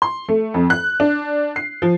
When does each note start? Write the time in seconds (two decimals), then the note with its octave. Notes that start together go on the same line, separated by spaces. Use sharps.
0.02 C6
0.28 A3
0.54 F2
0.70 F#6
1.00 D4
1.56 C7
1.82 F3